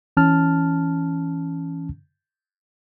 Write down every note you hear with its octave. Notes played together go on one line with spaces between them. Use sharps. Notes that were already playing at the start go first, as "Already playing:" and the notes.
E3 C#4 A5 F6